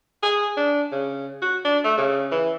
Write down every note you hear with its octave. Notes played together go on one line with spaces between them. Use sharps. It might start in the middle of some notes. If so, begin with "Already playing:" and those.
G#4
D4
C#3
F#4
D4
A3
C#3
E3